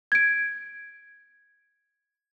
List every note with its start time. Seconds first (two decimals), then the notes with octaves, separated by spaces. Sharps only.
0.12 G#6 D7